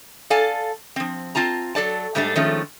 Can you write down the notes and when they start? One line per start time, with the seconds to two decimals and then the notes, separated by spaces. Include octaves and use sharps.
0.30 A4 D5 F5 G#5 A5
0.96 F3 C4
1.35 C4 F4 A5 A#5
1.75 F#3 A4 D5 A5
2.15 G#2 G3 A3 D4 A4
2.36 D#3 F3 G#3 A3 C#4